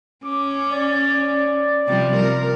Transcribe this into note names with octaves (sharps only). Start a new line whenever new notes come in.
C#4 D6
D5
C3 F3 G3
A#4